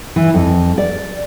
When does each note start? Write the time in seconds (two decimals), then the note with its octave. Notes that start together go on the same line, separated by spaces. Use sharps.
0.16 E3
0.34 F2
0.78 D5